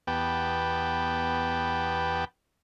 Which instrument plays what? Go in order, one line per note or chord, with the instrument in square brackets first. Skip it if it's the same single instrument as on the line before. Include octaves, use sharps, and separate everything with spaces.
[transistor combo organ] E2 B3 G4 B4 G5 A5